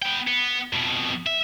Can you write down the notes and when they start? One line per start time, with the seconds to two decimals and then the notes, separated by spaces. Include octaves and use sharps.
0.02 B3 G5
0.27 B3
0.73 F2 B2
1.26 E5